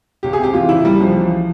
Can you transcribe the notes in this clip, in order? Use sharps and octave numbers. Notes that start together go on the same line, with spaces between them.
C#2 G4
G#4
C3
G4
E3 F4
C#2 E4
C#2 G3
C#2 F3
E3